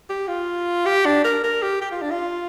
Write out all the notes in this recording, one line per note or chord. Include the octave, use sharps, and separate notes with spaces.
G4
F4
G4
D4
A#4
A#4
G4
G4
F4
D4
F4